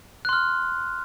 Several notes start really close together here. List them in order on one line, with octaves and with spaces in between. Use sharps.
F#6 C6 F6